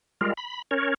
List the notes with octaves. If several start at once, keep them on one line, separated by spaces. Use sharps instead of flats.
G3 G#3 F4 A#4
B5
C#4 A#4 C#5